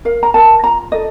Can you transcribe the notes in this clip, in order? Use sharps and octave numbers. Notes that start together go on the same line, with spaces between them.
A#4 F5
A#5
A#4 A5
F4 A#5
A4 D#5